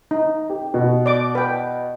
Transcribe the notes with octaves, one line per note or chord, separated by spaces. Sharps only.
D#4
G4
B2
D5 D6
B4 G5